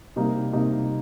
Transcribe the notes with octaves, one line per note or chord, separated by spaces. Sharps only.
C3 G3 A#3 D#4
C3 G3 A#3 D#4